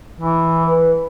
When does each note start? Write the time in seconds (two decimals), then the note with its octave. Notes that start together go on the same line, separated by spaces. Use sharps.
0.21 E3
0.67 B4